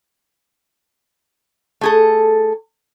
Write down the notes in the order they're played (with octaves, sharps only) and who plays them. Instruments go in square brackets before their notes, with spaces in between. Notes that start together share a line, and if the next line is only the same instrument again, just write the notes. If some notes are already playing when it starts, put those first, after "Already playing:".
[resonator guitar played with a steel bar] A3 G#4 A4